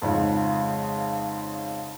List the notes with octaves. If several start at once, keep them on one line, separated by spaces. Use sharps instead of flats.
F2 G#2 C#3